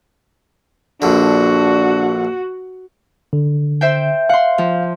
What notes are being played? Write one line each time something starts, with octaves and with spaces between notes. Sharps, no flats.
A#1 D3 D4 F#4
D3
C5 E5 G5
F5 F#5 C6
F3